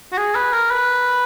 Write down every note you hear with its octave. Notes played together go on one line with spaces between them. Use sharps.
F#4
G#4
B4
A#4
B4